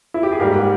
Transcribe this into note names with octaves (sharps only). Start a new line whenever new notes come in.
E4
G4
G#4
G#2 G3 A#3 G4 A#4